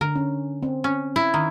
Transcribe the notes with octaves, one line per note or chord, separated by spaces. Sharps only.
D3 A#4
C#4
C4
C#4
E4
D#3